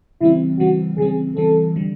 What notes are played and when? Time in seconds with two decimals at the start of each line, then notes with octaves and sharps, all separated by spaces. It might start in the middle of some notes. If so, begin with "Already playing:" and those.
0.21 C#3 E3 G3 C4 E4
0.59 C#3 E3 G3 C4 F#4
0.98 C#3 E3 G3 C4 G#4
1.36 C#3 E3 G3 C4 A4
1.76 D3 G3